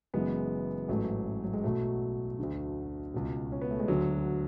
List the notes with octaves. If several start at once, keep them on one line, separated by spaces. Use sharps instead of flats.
F#1 F#2 E3 G#3 B3
A1 G#2 E3 F#3 A3
F#3
G#3
B1 B2 F#3 A3
D2 D3
C#2 B2
C#4
B3
A3
G#3
D2 D3 F#3